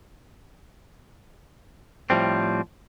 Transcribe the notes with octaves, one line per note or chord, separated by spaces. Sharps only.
A2 F3 G3 C4